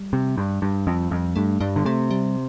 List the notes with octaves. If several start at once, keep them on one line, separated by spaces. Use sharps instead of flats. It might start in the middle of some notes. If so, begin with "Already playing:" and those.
Already playing: G3
C3
G2
G2
F2
F2
G2 A3
G2 G3
D3
C3 A3
G3